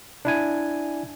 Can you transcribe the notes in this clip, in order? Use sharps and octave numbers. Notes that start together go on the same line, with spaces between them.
D4 E4 G#5